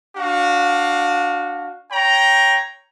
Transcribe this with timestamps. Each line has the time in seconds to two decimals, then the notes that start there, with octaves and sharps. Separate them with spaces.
0.16 D4 F#4 F5
1.91 C#5 G5 A#5